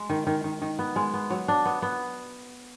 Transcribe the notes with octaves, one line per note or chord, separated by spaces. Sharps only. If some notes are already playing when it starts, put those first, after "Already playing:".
Already playing: G#3
D#3
D#3
D#3
D#3
B3
G#3
B3
F#3
D4
B3
B3